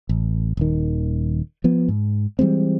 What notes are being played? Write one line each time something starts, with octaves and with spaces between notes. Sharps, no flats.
A1
D#1 D#3
F3 B3
G#2
E3 G3 G#3 C4